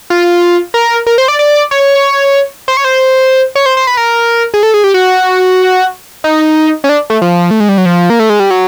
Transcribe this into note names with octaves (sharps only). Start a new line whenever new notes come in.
F4
A#4
A#4
C5
D5
D5
C#5
C5
C#5
C5
C#5
C5
C5
B4
A#4
G#4
A4
G#4
G4
F#4
D#4
C#4
D4
A3
F3
A3
G#3
G3
F#3
F3
A#3
A3
G#3
G3
F#3